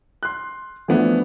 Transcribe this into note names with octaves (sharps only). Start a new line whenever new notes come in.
C6 F#6
E3 F3 A3 B3 D4 E4